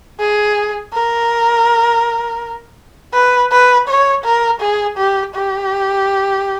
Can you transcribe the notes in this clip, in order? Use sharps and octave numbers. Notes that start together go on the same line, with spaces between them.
G#4
A#4
B4
B4
C#5
A#4
G#4
G4
G4